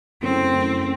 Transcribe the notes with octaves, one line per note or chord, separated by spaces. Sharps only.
F#2 C#3 E3 A3 C4
F#2 C#3 E3 A3